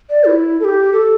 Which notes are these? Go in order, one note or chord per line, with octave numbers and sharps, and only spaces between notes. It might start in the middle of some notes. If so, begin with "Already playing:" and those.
D5
E4
A4
G4
A4